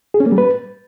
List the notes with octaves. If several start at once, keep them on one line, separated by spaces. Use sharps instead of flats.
G#4
C#4
A#3
G3
B4